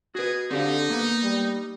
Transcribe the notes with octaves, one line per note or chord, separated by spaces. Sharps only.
F#4 G#4 B4
D3 C4 D#4 G4 F5
A#3 B3
G3